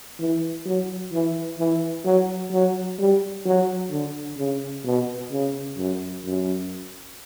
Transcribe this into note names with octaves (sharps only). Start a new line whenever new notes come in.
E3
F#3
E3
E3
F#3
F#3
G3
F#3
D3
C#3
B2
C#3
F#2
F#2